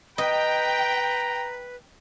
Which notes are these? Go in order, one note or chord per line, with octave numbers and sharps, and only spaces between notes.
B4 D#5 G5 A#5